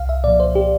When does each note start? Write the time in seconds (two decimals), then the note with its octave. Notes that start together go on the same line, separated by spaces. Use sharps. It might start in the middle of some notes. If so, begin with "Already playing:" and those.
Already playing: C2 F5
0.09 E5
0.24 A#2 F3 D5
0.40 C5
0.55 G4